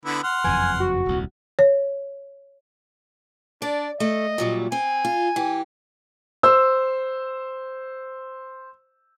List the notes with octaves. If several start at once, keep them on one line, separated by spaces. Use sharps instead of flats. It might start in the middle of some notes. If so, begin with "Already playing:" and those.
D3 B3 E4
F#5 C6 F6
F#1 F2 E3 G#5
F#4
D#1 C2
C#5
D4 D5
A3 D#5
A#2 F#3 G3
C4 G#5
F4
E3 G4
C5 E6